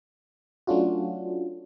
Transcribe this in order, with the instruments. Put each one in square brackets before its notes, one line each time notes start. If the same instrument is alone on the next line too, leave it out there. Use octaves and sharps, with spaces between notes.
[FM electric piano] F#3 A3 C#4 D4 F4 F#4